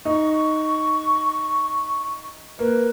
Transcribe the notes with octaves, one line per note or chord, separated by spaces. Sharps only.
D#4 C#6
A#3 B4